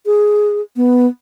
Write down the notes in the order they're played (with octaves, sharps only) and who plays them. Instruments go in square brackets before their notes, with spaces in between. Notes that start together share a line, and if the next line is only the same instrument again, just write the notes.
[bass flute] G#4
B3